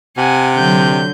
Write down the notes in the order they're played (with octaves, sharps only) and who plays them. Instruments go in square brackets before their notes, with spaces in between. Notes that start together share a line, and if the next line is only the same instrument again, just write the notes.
[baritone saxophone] C3 [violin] F#5 G#5
[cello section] D3 F#3 [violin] G6